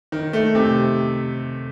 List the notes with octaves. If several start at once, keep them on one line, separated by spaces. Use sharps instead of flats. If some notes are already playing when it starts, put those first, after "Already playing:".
D#3
A3
C3